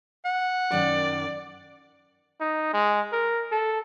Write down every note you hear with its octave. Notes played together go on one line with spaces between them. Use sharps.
F#5
F#2 D#3 D5
D#4
G#3
A#4
A4